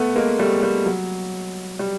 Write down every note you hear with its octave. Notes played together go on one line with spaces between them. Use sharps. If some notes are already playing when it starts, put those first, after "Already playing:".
Already playing: A3 B3
G#3 A#3
G3 A3
G3
F#3
G3